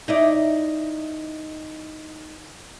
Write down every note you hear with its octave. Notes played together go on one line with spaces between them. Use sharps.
D#4 E4 D5